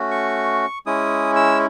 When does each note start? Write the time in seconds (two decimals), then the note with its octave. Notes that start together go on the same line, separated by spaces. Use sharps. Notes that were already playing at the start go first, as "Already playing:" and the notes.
Already playing: A3 C#4 F#4
0.11 C#6
0.86 G#3 C#4 E4 D#6
1.36 E6